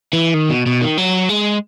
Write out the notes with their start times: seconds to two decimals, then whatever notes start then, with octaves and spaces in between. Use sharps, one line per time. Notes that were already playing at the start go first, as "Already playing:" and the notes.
0.13 E3
0.34 D#3
0.50 B2
0.66 B2
0.81 D#3
0.97 F#3
1.29 G#3